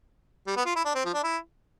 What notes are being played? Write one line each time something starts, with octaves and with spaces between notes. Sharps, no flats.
G3
B3
F4
E4
D4
C4
F3
D4
E4